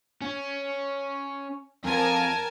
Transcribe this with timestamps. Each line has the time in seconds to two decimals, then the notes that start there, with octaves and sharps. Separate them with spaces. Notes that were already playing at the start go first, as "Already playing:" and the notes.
0.22 C#4
1.84 F2 A#4 G#5 A5